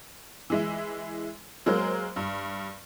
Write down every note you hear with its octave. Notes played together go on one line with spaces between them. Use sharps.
E3 G#3 E4
F#3 G#3 A#3 A#4 C5
G2